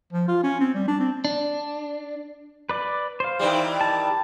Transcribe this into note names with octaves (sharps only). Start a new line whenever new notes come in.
F3
F4
C#4
C4
G3
D4
C4
D4
B4 D5
C5 F5
D#3 E3 G3
A5